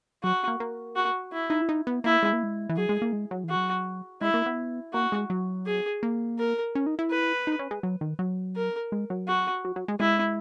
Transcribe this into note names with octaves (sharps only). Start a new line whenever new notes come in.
F#3 F#4
A#3
A#3
F#4
E4
D#4
E4
D#4
B3
A#3 E4
G#3
A#3
G#3
E3
F#3 G#4
G#3
A#3
G#3
F#3
E3
F#4
F#3
G#3 E4
A#3
B3
A#3 F#4
G#3
F#3
G#4
A#3
A#4
C#4
D#4
E4
B4
D#4
C#4
G#3
F#3
D#3
F#3
A#4
G#3
F#3
F#4
F#3
F#3
G#3
G#3 E4